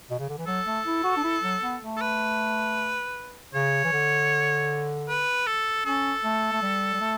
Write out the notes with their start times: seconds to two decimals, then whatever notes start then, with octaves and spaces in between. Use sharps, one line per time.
0.10 B2
0.19 C#3
0.29 D3
0.38 E3
0.47 F#3 A4
0.66 A3
0.85 E4
1.04 F#4
1.17 D4
1.24 E4
1.43 F#3
1.62 B3
1.81 A3
1.96 A4
2.01 B4
3.54 C#3 C#5
3.84 E3
3.92 D3
5.08 B4
5.46 A4
5.85 C#4 A4
6.24 A3
6.53 A3
6.62 G3
6.94 G3
7.01 A3